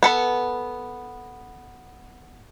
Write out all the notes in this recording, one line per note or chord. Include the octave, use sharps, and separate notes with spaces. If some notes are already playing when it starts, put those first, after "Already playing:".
B3 A4 B5